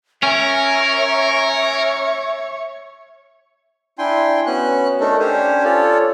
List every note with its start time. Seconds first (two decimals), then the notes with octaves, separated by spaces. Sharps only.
0.23 C#4 A#4 C#5 E5 C#6
3.99 D4 E4 G5 G#5 C6
4.47 B3 C#4 F#4 F#6
5.00 A3 D4 D#4 A4 A#4
5.20 C#4 D4 G4 C5 C#5 G#5
5.64 F4 A4 C#5 D5